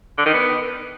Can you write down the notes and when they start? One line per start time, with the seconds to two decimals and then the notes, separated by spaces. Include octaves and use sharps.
0.18 D3
0.26 D#3
0.34 B3